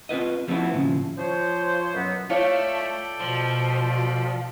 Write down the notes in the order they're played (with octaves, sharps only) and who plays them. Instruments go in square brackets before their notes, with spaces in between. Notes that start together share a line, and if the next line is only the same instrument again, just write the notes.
[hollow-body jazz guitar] C4 F4 B4 D#5
F3 G3 A3 B3 C4 E4
D#2 A2 C#3 F3
[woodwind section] F3 C5 C#5
F#2 B2 F#3 B3 F#5
[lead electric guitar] A3 [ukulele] F4 C#5 [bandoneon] A4 D5 G5
[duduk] B2 [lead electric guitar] F3